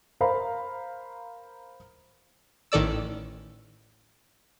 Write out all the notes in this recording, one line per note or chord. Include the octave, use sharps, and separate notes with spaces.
A#4 C5 F5 A#5 B5
A1 D#3 A4 D5 E6